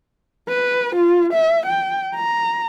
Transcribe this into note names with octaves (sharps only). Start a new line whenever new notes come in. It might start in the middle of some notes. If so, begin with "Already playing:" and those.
B4
F4
E5
G5
A#5